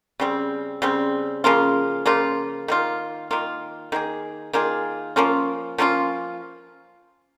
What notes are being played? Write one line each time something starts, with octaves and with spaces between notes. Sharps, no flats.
C#3 G3 C4
C#3 G3 C4
C#3 F3 A#3 F4
C#3 F3 A#3 F4
D#3 A#3 F4
D#3 A#3 F4
D#3 A#3 F4 G#4
D#3 A#3 F4 G#4
F3 A#3 C#4 F4
F3 A#3 C#4 F4